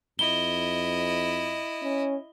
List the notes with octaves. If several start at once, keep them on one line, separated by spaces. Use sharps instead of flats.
F2 E4 D#5 G7
C#4